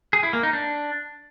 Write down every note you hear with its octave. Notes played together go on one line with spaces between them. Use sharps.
G#4
E4
A#3
D#4
D4